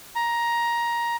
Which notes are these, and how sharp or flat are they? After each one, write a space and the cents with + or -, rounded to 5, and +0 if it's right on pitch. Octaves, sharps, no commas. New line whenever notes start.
A#5 +15